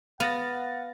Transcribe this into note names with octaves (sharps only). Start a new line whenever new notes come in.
B3 F5 F#5 A6 A#6